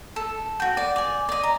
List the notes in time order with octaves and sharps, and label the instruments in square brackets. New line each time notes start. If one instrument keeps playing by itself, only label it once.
[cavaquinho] A4
F#4 G5
D5
D5 G#5
D5 D#5
A#5